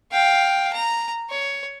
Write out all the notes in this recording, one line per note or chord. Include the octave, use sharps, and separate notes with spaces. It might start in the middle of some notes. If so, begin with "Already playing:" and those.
F5 G5
A#5
C#5